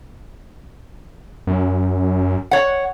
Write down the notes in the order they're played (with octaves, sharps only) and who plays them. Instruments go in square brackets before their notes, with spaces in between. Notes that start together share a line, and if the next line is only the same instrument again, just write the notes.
[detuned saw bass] F#2
[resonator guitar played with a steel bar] C#5 F#5